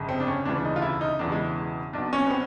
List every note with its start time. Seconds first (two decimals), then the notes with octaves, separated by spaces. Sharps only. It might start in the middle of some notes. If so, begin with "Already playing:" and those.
Already playing: G1 F2 C#3
0.09 C4
0.20 D4
0.27 C#4
0.45 E1 D2 C#3 E3 D4
0.65 D#4
0.76 F4
0.82 E4
1.01 D#4
1.19 E1 E2 C#3 E3 D4
1.32 G#3
1.93 B1 B2 D4
2.13 C#4
2.26 B3
2.30 C4